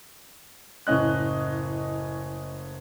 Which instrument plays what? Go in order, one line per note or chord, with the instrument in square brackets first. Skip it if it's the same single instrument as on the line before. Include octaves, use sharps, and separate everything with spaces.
[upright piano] F#1 A2 C#4 D#5 F#6